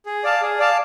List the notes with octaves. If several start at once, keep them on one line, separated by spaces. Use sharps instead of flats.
G#4
D5 F5 A5
G#4
D5 F5 A5